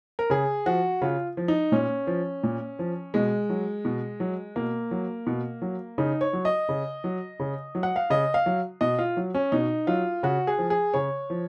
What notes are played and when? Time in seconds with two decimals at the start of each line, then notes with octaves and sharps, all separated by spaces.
0.19 A#4
0.30 C#3 G#4
0.66 F3 F#4
1.02 C#3 F4
1.37 F3
1.48 D#4
1.72 A#2 C#4
2.07 F3
2.43 A#2
2.79 F3
3.14 B2 G#3
3.49 F#3
3.85 B2
4.20 F#3
4.56 B2 A#3
4.91 F#3
5.27 B2
5.62 F#3
5.98 C#3 D#4
6.21 C#5
6.33 F#3
6.45 D#5
6.69 C#3
7.04 F#3
7.40 C#3
7.75 F#3
7.83 F#5
7.96 F5
8.10 C#3 D#5
8.34 F5
8.46 F#3
8.81 B2 D#5
8.99 F4
9.17 F#3
9.34 C#4
9.52 B2 D#4
9.87 F#3 F4
10.23 C#3 F#4
10.47 G#4
10.58 F3
10.70 G#4
10.94 C#3 C#5
11.30 F3